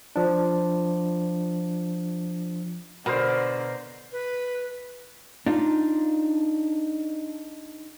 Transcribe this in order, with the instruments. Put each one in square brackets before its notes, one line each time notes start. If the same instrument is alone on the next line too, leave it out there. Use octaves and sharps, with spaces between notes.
[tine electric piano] F3 D4
[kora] B2 [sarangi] D3 [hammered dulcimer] A#4 C5
[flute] B4
[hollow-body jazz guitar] D4 D#4 F4